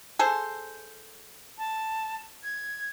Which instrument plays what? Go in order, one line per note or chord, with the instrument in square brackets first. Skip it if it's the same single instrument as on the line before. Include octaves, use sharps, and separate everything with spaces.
[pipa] G#4 A4 C5
[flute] A5
G#6